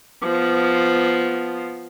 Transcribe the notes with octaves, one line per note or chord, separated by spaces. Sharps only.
F3 B3